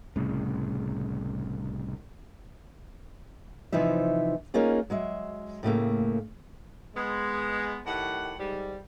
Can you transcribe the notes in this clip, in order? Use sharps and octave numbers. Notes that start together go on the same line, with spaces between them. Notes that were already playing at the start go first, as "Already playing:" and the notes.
C2 A2 C#3
C3 E3 F3 D#4 E5
A#3 C#4 D#4 F4 G#4
F#3 G#3 E5
A2 C#3 A3 A#3
G#3 B3
A2 D#3 G4 F#5
G#2 G3